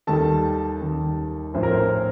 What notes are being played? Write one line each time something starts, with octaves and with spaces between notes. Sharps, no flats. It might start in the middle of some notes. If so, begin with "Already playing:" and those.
D#2 D#3 G3 A4 A5
D#2 D#3 G3
A#1 A2 F3 C5
A#4
C4 C5